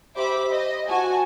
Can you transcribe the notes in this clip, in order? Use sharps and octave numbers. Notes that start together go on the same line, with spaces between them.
G4 C5 E5 B5 D6
C5 D#5
F#4 G#5 A5